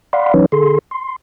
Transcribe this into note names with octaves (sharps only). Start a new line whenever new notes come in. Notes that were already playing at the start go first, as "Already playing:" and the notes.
D5 F5 F#5 B5 C6
E3 F#3 C#4 D#4 B4 C#5
D3 G#4 A4 C6
C6